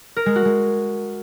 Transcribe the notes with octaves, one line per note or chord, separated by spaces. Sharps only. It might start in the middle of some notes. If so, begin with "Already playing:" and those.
A#4
G#3
F#4
G#3